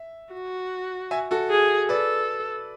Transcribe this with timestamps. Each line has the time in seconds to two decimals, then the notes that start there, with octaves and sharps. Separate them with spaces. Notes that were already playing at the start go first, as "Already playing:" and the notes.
Already playing: E5
0.33 F#4
1.11 E5 G#5
1.31 F#4 A4
1.50 G#4
1.89 A4 B4 D5